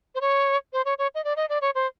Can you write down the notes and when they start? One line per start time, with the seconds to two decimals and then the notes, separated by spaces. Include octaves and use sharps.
0.15 C5
0.21 C#5
0.73 C5
0.85 C#5
0.98 C#5
1.15 D#5
1.24 D5
1.37 D#5
1.49 D5
1.62 C#5
1.75 C5